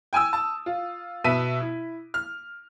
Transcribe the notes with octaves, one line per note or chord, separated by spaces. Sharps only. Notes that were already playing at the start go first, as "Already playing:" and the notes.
G5 G#5 D#6 E6
A5
F4
B2 B4 E5 A5 B6 D#7
E4
F6